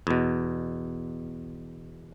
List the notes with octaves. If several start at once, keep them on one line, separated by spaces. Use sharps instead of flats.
E2 B2